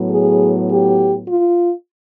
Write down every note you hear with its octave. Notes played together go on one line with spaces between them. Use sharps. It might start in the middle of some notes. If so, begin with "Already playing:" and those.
Already playing: A2 F#3 B3
G#4
G4
F4